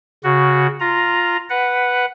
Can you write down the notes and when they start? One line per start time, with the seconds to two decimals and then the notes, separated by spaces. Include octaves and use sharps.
0.24 C#3 F#4
0.80 F4 A#5
1.50 B4 F#5